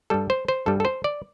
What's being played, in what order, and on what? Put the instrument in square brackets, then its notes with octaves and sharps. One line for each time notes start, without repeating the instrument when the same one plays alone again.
[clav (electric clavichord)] G2 G3 A4
C5
C5
G2 G3 A4
A4
C5
D5